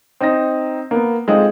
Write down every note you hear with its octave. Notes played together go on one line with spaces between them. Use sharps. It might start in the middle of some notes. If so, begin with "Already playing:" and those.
C4 D#4 D#5 A#6
A#3 B3
G#3 C4 D#4 F4 A4 D#5